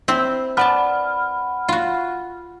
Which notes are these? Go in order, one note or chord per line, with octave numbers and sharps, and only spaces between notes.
C4 E4 C6
B4 D5 F#5 A5 B5 F6
F4 F#4